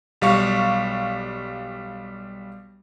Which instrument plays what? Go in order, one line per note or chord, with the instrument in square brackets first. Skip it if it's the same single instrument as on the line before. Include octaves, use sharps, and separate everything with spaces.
[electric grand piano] B1 G3 F5 C#6